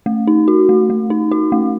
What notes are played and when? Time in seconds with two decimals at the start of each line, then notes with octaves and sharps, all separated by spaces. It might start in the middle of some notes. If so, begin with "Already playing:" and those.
0.06 A3
0.27 D#4
0.48 F#4
0.69 A3
0.90 A3
1.10 D#4
1.31 F#4
1.52 A3